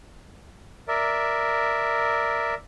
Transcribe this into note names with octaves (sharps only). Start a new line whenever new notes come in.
A#4 D5 E5